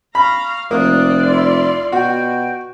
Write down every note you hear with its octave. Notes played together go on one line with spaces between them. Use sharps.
F5 A#5 B5 C#6
F1 A#3 F4 D5 D#6 F#6
E4 C6
B2 F#4 G5